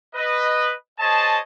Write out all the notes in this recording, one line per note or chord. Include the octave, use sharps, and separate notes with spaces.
B4 D#5
G#4 C5 C#5 D#5 A5